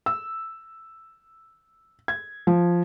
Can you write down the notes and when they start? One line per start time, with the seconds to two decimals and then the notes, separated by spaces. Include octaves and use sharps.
0.06 E6
2.08 G#6
2.47 F3